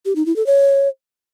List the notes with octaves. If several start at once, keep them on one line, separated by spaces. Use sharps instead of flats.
G4
D#4
E4
A4
C#5